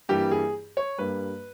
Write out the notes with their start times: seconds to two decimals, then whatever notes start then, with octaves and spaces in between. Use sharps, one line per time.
0.09 G2 E3 G3 A#3 G4
0.31 G#4
0.77 C#5
0.98 G2 G3 A#3 B4